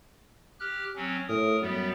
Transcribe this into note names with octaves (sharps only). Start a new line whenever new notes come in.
G4 F6 F#6
F#3 C4 C#4
A2 A#4 D#6
F#2 G3 B3